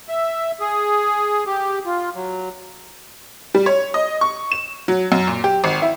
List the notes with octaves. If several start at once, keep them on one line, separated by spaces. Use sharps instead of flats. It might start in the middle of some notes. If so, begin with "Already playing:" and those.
E5
G#4
G4
F4
F#3
G3
C#5
D#5
C#6
E7
F#3
F#2
A#2
G4
G#1
E4